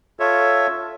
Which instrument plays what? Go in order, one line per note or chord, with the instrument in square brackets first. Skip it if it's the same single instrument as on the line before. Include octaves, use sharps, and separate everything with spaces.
[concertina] F4 A4 C#5 E5